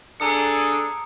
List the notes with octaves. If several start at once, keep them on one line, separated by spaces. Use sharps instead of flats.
D4 G#4 A4 A#5 D#6 C#7